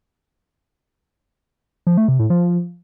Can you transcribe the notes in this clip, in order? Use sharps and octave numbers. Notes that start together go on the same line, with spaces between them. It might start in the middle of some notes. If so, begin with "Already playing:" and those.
F3
A3
C3
A2
F3